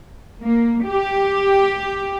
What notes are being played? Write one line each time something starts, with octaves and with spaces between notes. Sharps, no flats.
A#3
G4